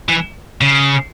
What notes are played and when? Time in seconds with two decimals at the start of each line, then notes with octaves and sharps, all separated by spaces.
0.08 E3
0.61 C#3